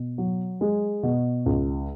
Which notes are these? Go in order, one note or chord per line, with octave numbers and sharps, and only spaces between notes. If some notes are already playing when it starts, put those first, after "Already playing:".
Already playing: B2
F#3
G#3
B2
C#2